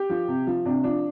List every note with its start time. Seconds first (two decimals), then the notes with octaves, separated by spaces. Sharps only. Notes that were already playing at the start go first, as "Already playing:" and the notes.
Already playing: G4
0.10 F3
0.28 C3
0.47 F3
0.65 C3 D4
0.84 F3 D4